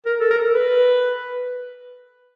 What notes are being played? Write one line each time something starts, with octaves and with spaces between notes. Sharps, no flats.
A#4
A4
A#4
B4